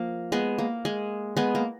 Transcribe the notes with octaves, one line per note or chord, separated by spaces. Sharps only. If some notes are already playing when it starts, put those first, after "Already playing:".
Already playing: F3 A#3
G#3 B3
A#3
G#3
G#3 B3
A#3